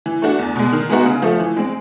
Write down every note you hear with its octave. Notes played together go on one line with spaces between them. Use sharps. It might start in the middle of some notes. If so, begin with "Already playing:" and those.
E3
A3 D4 F#4
E2
B2 G#3
D#3
G#3 B3 D#4 F#4
C#3
F3 A3
E3
G#3 C4